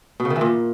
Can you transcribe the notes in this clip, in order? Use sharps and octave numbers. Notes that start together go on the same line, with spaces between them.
B2
C#3
D#3
E3
A#2